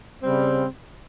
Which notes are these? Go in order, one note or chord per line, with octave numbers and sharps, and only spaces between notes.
C#3 G3 C4